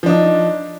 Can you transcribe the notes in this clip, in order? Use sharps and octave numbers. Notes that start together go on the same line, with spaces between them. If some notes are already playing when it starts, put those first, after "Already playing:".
F3 D4 D#4